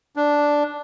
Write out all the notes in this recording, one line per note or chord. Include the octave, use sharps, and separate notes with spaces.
D4